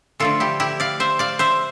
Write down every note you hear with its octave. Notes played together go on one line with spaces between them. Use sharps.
D3 F3 A3 F4 A4
E4 G4
E4 G4
D5 F5
C5 E5
D5 F5
C5 E5